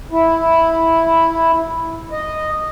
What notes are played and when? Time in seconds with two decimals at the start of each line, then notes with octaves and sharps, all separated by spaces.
0.12 E4
2.12 D#5